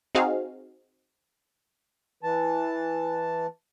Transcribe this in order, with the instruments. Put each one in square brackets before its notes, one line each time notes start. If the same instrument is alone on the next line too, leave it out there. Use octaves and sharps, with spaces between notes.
[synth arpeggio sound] C4 D#4 F#4 G#4 F5
[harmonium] E3 A5